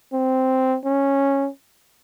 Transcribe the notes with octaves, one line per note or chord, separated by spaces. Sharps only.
C4
C#4